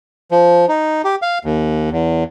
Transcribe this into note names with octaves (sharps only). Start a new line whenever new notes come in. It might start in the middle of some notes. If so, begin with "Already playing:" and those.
F3
D#4
G4
F5
D#2
E2